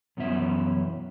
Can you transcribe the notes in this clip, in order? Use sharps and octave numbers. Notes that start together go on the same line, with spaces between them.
F#2 B2 E3 C#4 E5